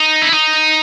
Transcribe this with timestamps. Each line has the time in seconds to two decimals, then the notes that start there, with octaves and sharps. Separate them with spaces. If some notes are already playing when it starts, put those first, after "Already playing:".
Already playing: D#4
0.22 E4
0.32 D#4